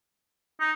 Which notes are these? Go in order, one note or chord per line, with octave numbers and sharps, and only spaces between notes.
D#4